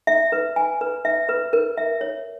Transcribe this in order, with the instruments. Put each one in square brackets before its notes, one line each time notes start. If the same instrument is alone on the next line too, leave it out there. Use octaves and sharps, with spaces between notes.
[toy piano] E5
B4
G#5
B4
E5
B4
A#4
E5
C#5